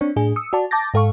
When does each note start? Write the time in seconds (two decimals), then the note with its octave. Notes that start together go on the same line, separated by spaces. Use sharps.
0.01 C4 D4 C#5
0.16 A2 D4 G#4
0.36 D#6 E6 C#7
0.53 F#4 D5 A5
0.71 A5 D6 G6 A6 A#6
0.94 G#2 A4 F5 C#6